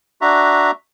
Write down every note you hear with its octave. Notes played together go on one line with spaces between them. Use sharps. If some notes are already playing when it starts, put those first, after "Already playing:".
D4 F#4 E5 A#5